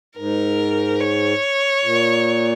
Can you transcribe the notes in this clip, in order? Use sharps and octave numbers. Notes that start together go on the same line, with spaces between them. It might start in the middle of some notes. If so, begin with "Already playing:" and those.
G#2 A#4
C#5
A#2